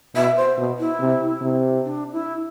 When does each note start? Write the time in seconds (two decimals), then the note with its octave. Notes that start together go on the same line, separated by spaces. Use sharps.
0.15 B2 E5
0.37 C5
0.58 B2
0.79 E4
1.00 C3
1.41 C3
1.84 D4
2.12 E4